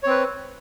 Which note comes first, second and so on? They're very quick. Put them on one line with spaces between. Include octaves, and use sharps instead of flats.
C#5 C4 B4